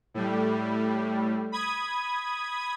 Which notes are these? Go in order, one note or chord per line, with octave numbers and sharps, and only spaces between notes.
A2 G3
B5 D#6 G#6